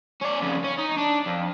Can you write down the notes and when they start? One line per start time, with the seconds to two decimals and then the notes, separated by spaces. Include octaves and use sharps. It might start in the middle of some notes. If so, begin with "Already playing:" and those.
0.21 C#4 D5
0.41 F2 C#3
0.64 C#4
0.79 D#4
0.98 D4
1.27 F2